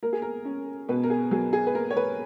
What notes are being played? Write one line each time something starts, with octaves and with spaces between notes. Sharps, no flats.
A#3 A#4
G#4
A#4
C#4
B2 B4
A#4
G#4
F#3 G#4
G#4
B4
A#3 A#4
C#5
B4